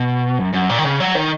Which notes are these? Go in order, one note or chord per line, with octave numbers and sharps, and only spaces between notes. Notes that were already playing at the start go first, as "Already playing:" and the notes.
Already playing: B2
F#2
F#2
A#2
D#3
C#3
F#3
D#3